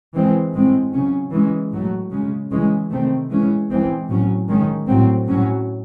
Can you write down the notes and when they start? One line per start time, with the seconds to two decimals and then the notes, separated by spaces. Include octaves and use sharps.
0.15 E3 G#3 C4
0.53 A2 G#3 C4
0.93 C#3 F#3 C#4
1.32 E3 G#3 C#4
1.72 A2 F#3 A3
2.11 C#3 G#3 C#4
2.51 C#3 E3 G#3 C#4
2.90 C3 D#3 A3 C4
3.30 E3 G#3 C#4
3.70 E3 G#3 C4
4.09 A2 F#3 C#4
4.48 D#3 G#3 C#4
4.87 A2 F#3 C4
5.27 A2 F#3 C#4